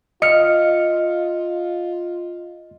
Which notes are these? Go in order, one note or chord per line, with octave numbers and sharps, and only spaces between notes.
F4 D#5 F6 C#7